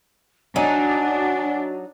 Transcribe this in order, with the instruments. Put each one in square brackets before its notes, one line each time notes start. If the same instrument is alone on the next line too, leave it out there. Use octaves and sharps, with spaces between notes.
[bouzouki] F#3 D#4 [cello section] D4 [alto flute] F#4 [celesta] G#5